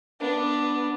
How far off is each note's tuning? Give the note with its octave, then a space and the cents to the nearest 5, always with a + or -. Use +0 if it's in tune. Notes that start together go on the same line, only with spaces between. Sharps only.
B3 -15 D4 +0